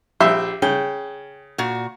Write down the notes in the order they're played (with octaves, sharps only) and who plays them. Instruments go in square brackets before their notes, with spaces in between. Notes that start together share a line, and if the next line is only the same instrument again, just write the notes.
[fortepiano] A#1 E5 [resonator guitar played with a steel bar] G4
[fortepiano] C#3 [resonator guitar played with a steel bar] G5
[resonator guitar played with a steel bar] A#2 F#4